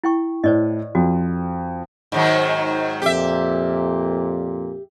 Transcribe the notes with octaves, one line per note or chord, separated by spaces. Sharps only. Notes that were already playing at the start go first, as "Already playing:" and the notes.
E4 G5 C#6
A2 C5 D5 D#5
F2 F#4
G#2 D#3 F#3
F2 A#2 G4 E5